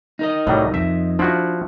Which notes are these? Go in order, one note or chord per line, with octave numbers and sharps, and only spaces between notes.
D#4 A#4 D#5
C2 A2 F#3 G3
F2 E5
F3 D4 E4 F#4